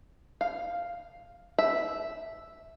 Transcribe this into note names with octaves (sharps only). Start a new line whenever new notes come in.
F5
E5